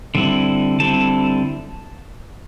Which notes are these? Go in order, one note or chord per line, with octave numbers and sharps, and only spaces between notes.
D3 G3 C4 E4
D3 G3 C4 E4 A5